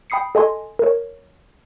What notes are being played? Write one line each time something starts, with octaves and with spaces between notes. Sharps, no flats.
G5 B5 D#6 C7 C#7
A4 D#5 G#5 C6
A#4 C#5